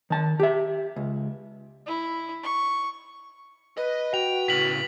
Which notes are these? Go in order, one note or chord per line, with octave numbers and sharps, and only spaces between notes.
D#3 A5
G4 E5
C#2
E4
C#6
B4 D#5
F#4 G5 F7
A2 C#3 B6 F#7